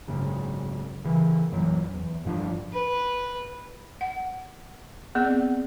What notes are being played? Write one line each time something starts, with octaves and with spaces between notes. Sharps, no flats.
G#1 F#2 C#3
C#3 E3
A#1 F#2 E3 F#3
E2
G1 A2 F3 D4
B4
F#5
B3 C4 G#4 D5